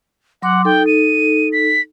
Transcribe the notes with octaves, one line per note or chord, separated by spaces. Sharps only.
F#3 F#5 C6 D6
D#4 A4 G5
D#7
B6